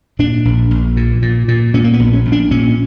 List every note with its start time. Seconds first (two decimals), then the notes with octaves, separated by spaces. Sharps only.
0.19 A#2 D4
0.45 A#1
0.71 A#1
0.97 A#2
1.22 A#2
1.48 A#2
1.74 A#2 C#4
1.84 A#3
1.93 B3
1.99 A#1
2.13 C#4
2.26 A#1
2.32 D4
2.51 A#2 C#4